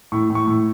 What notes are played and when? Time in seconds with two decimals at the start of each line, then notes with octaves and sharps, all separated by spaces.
0.12 A2 C#6
0.29 A2
0.35 C#6
0.47 A2